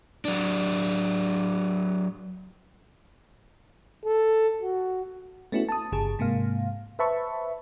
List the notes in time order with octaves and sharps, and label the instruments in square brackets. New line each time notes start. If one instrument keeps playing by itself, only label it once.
[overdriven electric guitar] F#3 D4
[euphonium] A4
F#4
[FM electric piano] A3 B3 C#4 E4 F#4
A5 D#6
G1 C#3 G#4 A5
G#2 C3 A#3 F5
B4 C5 E5 A5 B5 C#6